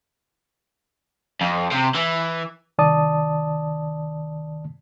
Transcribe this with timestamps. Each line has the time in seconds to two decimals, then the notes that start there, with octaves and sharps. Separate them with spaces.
1.41 F2
1.71 C3
1.95 E3
2.78 C2 D#3 D5 A5 D#6